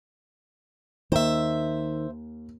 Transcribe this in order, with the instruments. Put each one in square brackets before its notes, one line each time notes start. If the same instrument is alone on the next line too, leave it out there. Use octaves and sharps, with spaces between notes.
[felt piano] D#2 [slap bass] D#3 [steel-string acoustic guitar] C5 E5